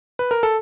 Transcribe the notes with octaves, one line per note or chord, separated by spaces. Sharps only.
B4
A#4
A4